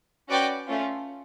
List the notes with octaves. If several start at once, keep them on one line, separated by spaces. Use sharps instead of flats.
C#4 F#4 B4 D5 G5
A3 C#4 F4